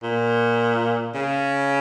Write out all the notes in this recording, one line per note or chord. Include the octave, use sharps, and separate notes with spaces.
A#2
C#3